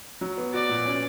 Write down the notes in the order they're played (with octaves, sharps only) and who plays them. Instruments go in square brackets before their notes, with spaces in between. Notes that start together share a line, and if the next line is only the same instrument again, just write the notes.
[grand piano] F#3
B3
[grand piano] F#4 [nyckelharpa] D5
[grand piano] A#2
C#4